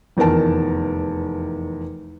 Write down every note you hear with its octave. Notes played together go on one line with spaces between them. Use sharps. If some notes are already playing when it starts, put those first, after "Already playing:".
F1 E2 D#3 A#4 A5